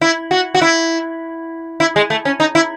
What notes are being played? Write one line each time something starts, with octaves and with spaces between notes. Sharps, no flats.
E4
F#4
F#4
E4
E4
G#3
A3
C#4
D#4
E4